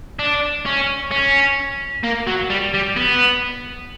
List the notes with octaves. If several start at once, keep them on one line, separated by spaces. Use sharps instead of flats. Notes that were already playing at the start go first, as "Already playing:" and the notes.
D4
C#4
C#4
A#3
F#3
G3
G3
B3